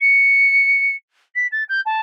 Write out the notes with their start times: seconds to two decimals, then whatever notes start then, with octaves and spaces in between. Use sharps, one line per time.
0.01 C#7
1.35 B6
1.52 A6
1.69 G6
1.85 A5